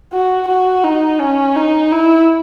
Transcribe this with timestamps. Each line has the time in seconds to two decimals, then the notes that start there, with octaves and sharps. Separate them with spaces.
0.13 F#4
0.48 F#4
0.84 D#4
1.20 C#4
1.56 D#4
1.92 E4